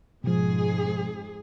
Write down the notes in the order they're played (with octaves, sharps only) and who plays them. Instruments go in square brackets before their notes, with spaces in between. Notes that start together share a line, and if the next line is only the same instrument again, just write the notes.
[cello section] F2 G#2 G#4 [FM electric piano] B2 F3